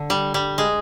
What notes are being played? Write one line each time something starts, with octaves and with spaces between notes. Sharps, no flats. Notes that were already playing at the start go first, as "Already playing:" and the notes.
Already playing: D3
G3
G3
G#3